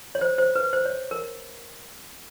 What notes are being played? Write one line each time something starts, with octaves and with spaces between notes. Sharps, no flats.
C#5
C5
C5
B4
C5
C#5
A#4